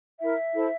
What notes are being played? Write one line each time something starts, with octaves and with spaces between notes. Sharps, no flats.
E4 A#4 E5
E4 A4 C5